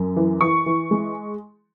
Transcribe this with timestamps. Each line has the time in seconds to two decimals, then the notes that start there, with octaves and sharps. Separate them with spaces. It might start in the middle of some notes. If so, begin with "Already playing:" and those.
Already playing: F#2
0.16 E3
0.41 E3 C#6
0.66 E3
0.91 G#3